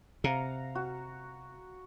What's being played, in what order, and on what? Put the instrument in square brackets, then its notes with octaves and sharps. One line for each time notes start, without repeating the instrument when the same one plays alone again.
[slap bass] C3 [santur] F5 F#5 A#5
[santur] F#4